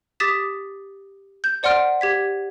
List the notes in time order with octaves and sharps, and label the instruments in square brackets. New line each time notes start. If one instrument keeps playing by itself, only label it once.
[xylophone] G4 D6 D#6 A6 B6 E7
G6
C5 D5 F#5 C6 F6 D7
G4 G#6 B6